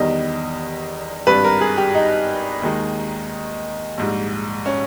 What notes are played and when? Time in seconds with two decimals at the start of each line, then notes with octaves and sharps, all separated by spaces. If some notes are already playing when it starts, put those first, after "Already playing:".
Already playing: E2 D#3 G3 D#5
1.27 G#1 G2 G3 B4
1.44 A#4
1.61 G#4
1.78 G4
1.95 D#4
2.62 D#2 D#3 G#3
3.98 A#1 G#2 G3
4.66 C#4